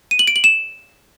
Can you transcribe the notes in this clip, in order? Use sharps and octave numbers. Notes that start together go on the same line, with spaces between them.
D#7
F#7
D7
F#7
E7